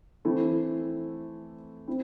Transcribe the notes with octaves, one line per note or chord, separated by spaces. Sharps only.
E3 A3 C4 E4
C4 E4